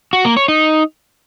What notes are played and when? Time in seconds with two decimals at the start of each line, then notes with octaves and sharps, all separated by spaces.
0.13 F#4
0.25 A#3
0.37 C#5
0.48 D#4